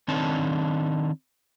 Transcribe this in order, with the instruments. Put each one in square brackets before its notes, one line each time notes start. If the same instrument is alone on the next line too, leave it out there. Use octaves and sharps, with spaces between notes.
[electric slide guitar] D#3 C4 D4 D#4 C#5 A5